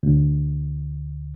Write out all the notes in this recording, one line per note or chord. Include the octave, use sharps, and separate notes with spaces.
D2